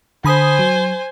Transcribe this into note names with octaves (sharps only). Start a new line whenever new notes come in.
D3 C5 G#5 B5 D#6
F#3